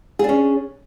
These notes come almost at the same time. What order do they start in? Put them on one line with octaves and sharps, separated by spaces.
G#4 D4 C#4